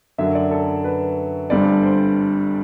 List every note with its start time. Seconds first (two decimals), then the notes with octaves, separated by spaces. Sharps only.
0.18 F#2 D3 F#3 E5
0.35 D5
0.51 A4
0.84 B4
1.50 G1 G2 D3 G3 C4 D5
1.83 C5